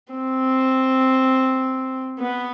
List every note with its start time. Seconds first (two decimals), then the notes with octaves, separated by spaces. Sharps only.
0.13 C4
2.20 B3